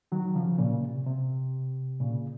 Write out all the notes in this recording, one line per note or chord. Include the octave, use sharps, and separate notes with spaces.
D#3 F#3
D#3
C#3 F3
A#2 C#3
C3
C3
A#2 C#3